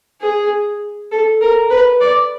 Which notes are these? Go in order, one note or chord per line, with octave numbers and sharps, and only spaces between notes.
G#4
A4
A#4
B4
D5